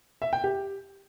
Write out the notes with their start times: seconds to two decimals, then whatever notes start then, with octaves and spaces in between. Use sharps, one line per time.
0.22 E5
0.33 G5
0.44 G4